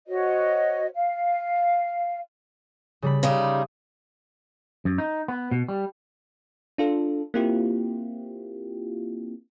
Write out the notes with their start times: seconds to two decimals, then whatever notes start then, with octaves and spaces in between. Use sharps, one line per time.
0.08 F#4 C5 C#5 D#5
0.94 F5
3.02 C#3 G3 B5
3.23 C#3 G3 D#4 C6 D#6 D7
4.85 F#2
4.98 D#4
5.28 B3
5.51 B2
5.69 G3
6.78 D4 F4 A4
7.34 A#3 C4 E4 F4 G4